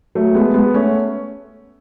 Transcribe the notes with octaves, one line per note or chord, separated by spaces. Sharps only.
F#3 A3
G#3 B3
G#3 B3
A3 C#4